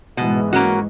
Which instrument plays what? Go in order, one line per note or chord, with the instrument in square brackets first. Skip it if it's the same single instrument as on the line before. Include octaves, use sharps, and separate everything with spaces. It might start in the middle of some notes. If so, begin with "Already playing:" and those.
[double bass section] G#2 E3 G#3 [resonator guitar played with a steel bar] B2
[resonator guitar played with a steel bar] A#3 C#4 F#4